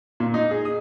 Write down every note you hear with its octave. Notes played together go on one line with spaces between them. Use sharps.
A#2
D#4
G#4
D#6